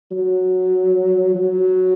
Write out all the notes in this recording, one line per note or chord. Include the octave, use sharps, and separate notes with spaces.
F#3
F#3